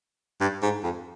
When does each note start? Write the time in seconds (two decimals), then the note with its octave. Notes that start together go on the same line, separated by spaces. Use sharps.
0.41 G2
0.63 G#2
0.83 F2